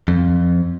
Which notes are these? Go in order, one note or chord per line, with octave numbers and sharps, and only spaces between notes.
F2